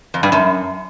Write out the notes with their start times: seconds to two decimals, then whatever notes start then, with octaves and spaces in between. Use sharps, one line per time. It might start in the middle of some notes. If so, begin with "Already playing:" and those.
0.14 F2
0.23 G2
0.32 F#2